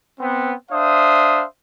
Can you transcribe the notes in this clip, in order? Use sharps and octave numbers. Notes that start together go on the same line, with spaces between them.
B3 C4
D4 C5 E5 F5 D#6